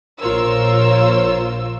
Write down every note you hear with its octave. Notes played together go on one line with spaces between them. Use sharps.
A#1 F4 A#4 C5 C#5 E6